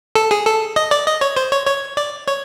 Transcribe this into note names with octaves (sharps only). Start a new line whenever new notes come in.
A4
G#4
A4
D#5
D5
D#5
C#5
C5
C#5
C#5
D5
C#5